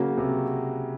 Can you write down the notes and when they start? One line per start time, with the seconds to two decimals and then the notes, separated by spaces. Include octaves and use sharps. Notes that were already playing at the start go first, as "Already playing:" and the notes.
Already playing: C#3 F#3 A#3 C#4 F#4
0.17 C3